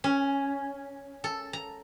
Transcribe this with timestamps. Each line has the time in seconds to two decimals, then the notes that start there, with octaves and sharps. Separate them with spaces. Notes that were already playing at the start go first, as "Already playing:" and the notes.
0.04 C#4
1.24 A4
1.53 A#5